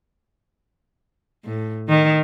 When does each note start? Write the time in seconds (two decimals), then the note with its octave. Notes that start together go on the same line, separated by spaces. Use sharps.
1.45 A2
1.89 D#3